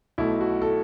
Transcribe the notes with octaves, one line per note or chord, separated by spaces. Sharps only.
B1 B2 A3 E4
F#4
A4